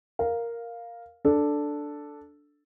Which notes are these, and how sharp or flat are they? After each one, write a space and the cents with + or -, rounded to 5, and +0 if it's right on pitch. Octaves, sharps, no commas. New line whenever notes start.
A#4 +0 F5 +0
D4 +0 A4 +0